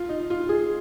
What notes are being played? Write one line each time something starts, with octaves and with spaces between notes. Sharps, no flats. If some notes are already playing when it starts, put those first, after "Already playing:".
Already playing: F4
D#4
F4
G#4